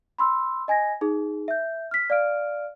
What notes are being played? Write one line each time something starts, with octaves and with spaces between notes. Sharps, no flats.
B5 C6 E6
D#5 G#5 G#6 A#6
D#4 G#4
E5 G6
F6 B6
D5 F5 F6 D7